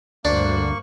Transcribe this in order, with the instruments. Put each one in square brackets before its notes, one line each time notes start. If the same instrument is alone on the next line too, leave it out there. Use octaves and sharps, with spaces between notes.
[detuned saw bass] D2 [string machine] G2 C5 F#6 [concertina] A#3 C#6 [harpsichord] D4